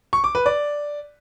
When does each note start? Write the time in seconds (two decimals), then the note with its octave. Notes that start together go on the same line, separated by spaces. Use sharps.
0.13 C#6
0.24 D6
0.35 B4
0.46 D5